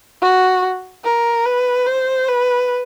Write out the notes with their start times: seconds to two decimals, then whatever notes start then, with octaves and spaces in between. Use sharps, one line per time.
0.22 F#4
1.04 A#4
1.45 B4
1.87 C5
2.28 B4